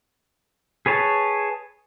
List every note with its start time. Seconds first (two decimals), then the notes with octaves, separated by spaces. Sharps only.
0.86 G#4 B4 C#5 A5